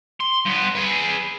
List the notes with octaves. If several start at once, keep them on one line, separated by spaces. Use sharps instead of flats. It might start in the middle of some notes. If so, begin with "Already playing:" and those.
C6
G2 B3
G#4 B4